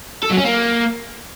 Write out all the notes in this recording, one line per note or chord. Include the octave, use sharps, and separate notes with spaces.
A4
F#3
C#4
A#3